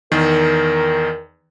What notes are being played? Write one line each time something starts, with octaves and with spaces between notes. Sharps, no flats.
E2 D#3 A#4